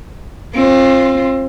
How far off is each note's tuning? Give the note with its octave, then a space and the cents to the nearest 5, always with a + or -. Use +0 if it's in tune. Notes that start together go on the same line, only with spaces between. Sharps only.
C4 +35 F4 +0